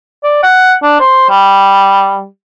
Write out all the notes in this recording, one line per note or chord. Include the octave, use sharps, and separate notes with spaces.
D5
F#5
D4
C5
G3